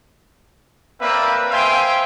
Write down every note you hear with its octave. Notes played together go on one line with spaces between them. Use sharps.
A#3 C4 B4 D5 E5
C5 E5 F5 G5 G#5